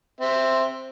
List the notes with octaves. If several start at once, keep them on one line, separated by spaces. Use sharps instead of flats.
C4 E5